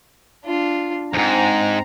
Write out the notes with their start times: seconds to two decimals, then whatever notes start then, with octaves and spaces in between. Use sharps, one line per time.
0.44 D4 F4
1.14 F2 G#2 C4 A#5